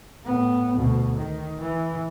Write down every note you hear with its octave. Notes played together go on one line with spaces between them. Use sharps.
A2 B3
D2 B2
D#3
E3